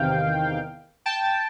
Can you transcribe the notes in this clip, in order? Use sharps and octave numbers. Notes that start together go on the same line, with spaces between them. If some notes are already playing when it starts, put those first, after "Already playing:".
Already playing: E2 C3 D#3 F5 G5
G5 A5